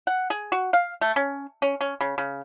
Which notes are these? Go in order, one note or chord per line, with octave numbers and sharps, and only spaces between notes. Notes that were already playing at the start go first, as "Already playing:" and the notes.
F#5
G#4
F#4
F5
A3
C#4
C#4
C#4
C#3
C#3